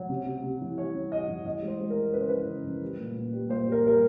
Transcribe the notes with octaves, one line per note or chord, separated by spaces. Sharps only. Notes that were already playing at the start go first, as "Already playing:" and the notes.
Already playing: F#3
C3
C3
C3
E3
G3 C#5
C3
G3 D#5
E3
E3 D#5
G#3
C5
G#3
A#4
G#3
C#3 B4
C5
E3 B4
C#3
E3
G3
A#2
A#2
G3
A#2 C5
G3
A#4
G3 A#4